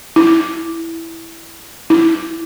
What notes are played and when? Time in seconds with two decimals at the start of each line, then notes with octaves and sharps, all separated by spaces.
0.16 E4
1.90 E4